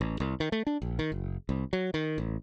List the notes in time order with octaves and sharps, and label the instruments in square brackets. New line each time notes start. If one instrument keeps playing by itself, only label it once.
[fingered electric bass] A1
C2
D#3
A3
D4
A#1
D#3
F#1
C2
F#3
D#3
A1